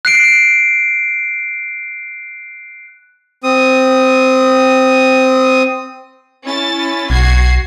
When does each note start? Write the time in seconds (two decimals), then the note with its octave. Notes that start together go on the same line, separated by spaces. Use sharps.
0.05 F#6 C7 D7
3.43 C4 D#6
6.45 C#4 E4 A6
7.10 B1 F#4 G#6 C7